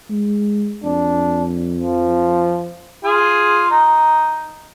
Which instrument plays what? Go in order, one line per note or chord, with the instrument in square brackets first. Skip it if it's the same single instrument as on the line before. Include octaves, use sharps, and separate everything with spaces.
[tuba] G#3
[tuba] F2 [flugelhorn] D4
[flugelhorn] F3
[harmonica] F4 G#4
D#4